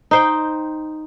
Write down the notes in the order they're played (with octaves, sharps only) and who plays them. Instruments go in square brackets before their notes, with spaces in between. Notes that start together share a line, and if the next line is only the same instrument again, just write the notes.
[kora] D#4 C5 G5